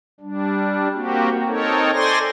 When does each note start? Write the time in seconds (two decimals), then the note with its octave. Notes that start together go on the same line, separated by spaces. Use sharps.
0.20 G3 D4
0.95 A#3 C4 F#4 G4
1.47 C4 D#4 A4 A#4 C#5
1.93 A4 C5 D5 G#5 C6 A#6